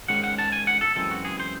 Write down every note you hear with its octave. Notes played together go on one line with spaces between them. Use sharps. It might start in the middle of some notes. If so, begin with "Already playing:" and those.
G#2 D#3 G#3 C#4 F#5
F#5
A5
G#5
F#5
A4
F#2 E3 G#3 C4 A4
F#4
G#4
C5